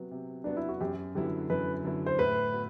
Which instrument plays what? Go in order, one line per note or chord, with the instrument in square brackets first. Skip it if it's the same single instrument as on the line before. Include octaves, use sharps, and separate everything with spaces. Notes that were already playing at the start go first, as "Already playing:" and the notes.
Already playing: [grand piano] C3 F#3 B3
C3
[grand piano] F#3 B3 [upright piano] D4
[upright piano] E4
F#4
[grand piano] F#2 [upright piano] G4
[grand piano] D3 F#3 B3 E4 [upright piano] G4
[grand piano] F#2 [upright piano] B4
[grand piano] D3 F#3 B3 E4
[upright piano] C5
[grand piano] A2 [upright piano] B4
[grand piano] B3 F#4